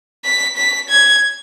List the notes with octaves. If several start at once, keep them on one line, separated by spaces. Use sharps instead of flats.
B6
B6
G#6